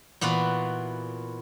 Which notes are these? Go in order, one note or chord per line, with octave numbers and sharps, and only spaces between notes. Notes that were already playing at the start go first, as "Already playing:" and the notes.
A#2 E3 B3 F4 F#4